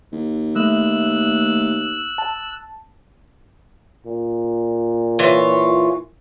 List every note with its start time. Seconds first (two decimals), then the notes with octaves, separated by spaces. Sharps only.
0.12 D#2
0.56 A3 E6 F#6
2.18 A5
4.06 A#2
5.19 E3 F4 C#5